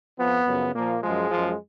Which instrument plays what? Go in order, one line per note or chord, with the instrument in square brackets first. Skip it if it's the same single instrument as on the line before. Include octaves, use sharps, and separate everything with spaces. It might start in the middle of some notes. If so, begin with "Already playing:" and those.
[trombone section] F2 F3 B3
F#2 C#3 F3
A#2 F3 A#3
F#2 F3 G#3
F#2 F3